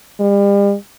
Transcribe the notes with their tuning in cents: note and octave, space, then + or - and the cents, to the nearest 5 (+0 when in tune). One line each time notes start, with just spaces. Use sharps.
G3 +40